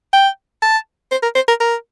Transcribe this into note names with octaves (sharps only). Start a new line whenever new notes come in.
G5
A5
C5
A#4
C5
A#4
A#4